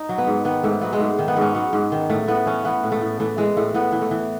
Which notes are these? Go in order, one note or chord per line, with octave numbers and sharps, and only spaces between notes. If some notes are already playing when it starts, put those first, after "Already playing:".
Already playing: D#4
F#3
B3
G#2
D#3 B3
G#2 A3
F#3 B3
G#3
G#2 A3
D#3
B3
G#2 C#4
F#3 B3
G#2
D#3
A2 A3
A2 B3
E3 C#4
E3 B3
A2
A3
A2
E3 A3
E3 G#3
A2 A3
A2 B3
E3
A3
E3